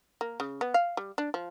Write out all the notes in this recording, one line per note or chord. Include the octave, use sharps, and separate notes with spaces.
A#3
C#3
B3
F5
G3
D4
F3